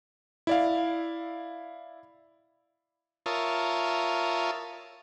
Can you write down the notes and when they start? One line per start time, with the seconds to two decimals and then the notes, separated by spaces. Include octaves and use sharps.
0.47 E4 D5 F5
3.26 F4 A#4 C#5 E5 A5 D#6